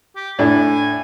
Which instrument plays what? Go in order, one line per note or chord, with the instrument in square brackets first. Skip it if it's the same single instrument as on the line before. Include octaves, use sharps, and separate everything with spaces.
[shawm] G4
[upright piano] A2 D4 [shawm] G#5